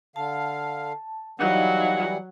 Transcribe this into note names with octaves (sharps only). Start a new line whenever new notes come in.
D3 F5 A5
E3 F#3 G3 D#4 D#5 F5 F#5